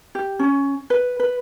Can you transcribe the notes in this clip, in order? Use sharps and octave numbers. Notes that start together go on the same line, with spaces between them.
G4
C#4
B4
B4